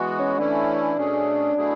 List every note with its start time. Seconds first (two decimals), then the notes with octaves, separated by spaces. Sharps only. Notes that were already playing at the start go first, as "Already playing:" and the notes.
Already playing: E3 G#3 B3 F#4
0.19 C#4
0.38 E3 A3 C#4 D4 E4
0.96 B2 A3 C#4 G#4
1.55 B2 F#3 A3 E4 G#4